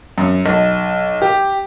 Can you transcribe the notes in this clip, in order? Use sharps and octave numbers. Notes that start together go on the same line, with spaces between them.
F#2
B1
G4